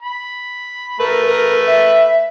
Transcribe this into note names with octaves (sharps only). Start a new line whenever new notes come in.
B5
A3 A#4 B4
A#4
E5